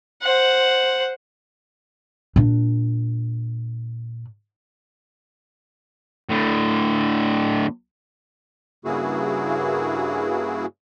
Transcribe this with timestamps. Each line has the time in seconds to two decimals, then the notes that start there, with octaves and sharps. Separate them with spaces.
0.22 C5 F#5
2.36 A#2 D4
6.30 A2 D3
8.85 G2 C#3 A#3 E4 F#4 G#4